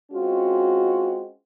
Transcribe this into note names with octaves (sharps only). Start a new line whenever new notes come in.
G#3 C4 C#4 F4 F#4